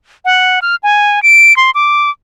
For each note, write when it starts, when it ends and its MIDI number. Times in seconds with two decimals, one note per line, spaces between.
0.25 0.59 78
0.62 0.75 89
0.83 1.22 80
1.23 1.56 98
1.57 1.71 84
1.75 2.10 86